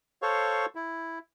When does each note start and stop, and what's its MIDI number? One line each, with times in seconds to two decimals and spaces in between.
0.22 0.66 69
0.22 0.66 72
0.22 0.66 73
0.22 0.66 77
0.22 0.66 85
0.75 1.19 64